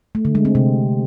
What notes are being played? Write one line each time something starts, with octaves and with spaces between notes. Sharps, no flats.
A3
D3
G#3
C4
C3